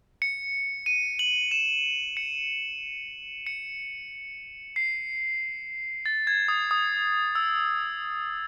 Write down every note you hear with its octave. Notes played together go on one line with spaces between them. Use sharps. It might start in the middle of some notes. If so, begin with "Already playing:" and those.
C#7
D#7
F#7
E7
C#7
C#7
C7
A6
G#6
D#6
D#6
E6